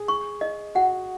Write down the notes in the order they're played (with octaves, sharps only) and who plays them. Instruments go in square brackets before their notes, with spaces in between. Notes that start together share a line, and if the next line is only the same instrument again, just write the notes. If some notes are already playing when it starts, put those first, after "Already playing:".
Already playing: [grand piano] G#4
[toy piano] C#6
D#5
[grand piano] F#4 [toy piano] F#5